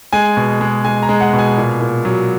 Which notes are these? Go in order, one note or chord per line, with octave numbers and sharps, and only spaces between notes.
G#3 G#5
B2
G#3
G#3 G#5
A#5
G#3
F#5
B2
G#5
A#2
A#2
F#3